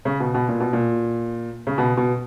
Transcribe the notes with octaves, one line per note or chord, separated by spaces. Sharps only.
C#3
B2
B2
A#2
B2
A#2
C#3
B2
B2